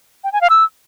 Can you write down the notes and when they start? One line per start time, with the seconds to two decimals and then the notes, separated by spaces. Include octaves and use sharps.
0.24 G5
0.33 G#5
0.41 F5
0.50 E6